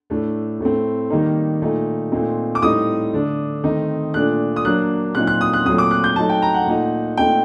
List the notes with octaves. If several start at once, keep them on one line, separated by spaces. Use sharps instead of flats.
A2 A3 D4
A2 A3 C4
D#3 G3 A#3 D#4
A#2 A3 D#4
A#2 A3 C4 D#4
D6
A2 G3 C4 D#4 D#6
D3 A3 D4
D#3 A3 C4 D#4
A#2 A3 D4 F#6
D#6
F#3 A#3 D4 F#6
A#2 F#3 C4 D#4 F#6
F#6
D#6
F#6
A#2 F#3 A3 C4 D#6
D6
F#6
G6
F#3 A3 D#4 A5
G5
A#5
F#5
A#2 A3 D#4
A#2 A3 C4 D#4 G5